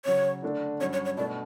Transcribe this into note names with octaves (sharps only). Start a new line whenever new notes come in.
C#3 F#3 C#4 C#5
D3 A3 D4 A4
G2 F#3 C#4 C#5
C#5
C#5
B2 A3 D4 D5